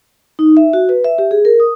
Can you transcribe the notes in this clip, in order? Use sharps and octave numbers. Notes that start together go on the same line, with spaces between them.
D#4
E5
F#4
B4
E5
G4
G#4
A#4
D#6